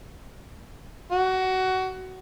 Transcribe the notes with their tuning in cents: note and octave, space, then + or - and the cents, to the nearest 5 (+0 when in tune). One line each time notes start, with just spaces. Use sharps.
F#4 +20